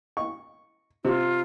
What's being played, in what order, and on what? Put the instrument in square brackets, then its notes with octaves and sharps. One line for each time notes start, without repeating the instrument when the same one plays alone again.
[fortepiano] C#6
[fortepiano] C3 [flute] F4